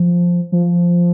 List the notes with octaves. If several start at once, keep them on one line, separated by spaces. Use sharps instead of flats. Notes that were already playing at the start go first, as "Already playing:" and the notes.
Already playing: F3
F3